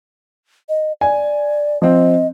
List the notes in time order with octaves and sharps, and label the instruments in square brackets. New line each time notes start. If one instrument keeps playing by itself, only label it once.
[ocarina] D#5
[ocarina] D5 [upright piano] G#5
[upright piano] F3 C4 [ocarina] D#5